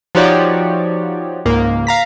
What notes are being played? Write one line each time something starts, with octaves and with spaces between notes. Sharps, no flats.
F3 D#4 F#4 G4 C#5 D5
C#2 G#2 A#3
F5 A#5 B6